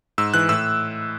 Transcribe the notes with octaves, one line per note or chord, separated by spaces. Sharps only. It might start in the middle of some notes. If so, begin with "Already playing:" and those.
G#2 E6
E3 F#6
A2 E6